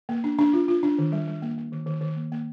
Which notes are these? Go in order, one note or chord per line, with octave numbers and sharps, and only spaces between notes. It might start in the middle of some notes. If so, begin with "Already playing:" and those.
A#3
D4
D4
F4
F4
D4
D#3
G3
G3
A#3
A#3
D#3
D#3
D#3
A#3
A#3